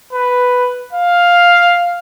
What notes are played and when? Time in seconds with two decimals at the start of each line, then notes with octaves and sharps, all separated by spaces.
0.12 B4
0.93 F5